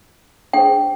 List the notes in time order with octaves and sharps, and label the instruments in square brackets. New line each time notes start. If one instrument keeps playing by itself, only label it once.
[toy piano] D4 G#4 C5 G5